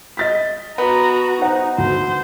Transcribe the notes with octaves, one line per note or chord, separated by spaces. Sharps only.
D#5 A6 B6
B3 F#4 A#5
D#4 C5 F#5 A#5
D2 C5